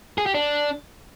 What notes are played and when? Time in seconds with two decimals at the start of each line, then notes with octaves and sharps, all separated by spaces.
0.18 G#4
0.26 G4
0.34 D4